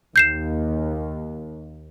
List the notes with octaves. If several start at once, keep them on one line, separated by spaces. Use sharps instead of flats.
D#2 G6 C7 E7